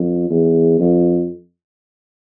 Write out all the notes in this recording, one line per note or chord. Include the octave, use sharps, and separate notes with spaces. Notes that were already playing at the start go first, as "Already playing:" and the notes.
Already playing: F2
E2
F2